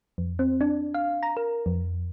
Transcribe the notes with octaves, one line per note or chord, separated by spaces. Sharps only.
F2
C4
D4
F5
A#5
A#4
F2